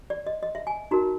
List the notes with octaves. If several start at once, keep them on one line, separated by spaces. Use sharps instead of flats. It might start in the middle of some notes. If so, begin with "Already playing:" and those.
D5
D#5
D#5
E5
G#5
D#4 F#4 A#4 A#5